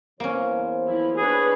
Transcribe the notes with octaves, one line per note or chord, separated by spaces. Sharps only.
E2 E3 A#3 C#4 C5
F3 E4
D4 G#4 B4 C#5